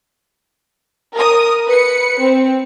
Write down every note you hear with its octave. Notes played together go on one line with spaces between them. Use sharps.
A#4 D#6
B4 C#7
C4